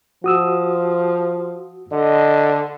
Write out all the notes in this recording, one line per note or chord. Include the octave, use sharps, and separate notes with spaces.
F3 F#4 D#6 E6
D3 D#5